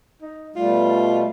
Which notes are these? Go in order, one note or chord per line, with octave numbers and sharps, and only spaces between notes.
D#4
B2 G3 A3 F4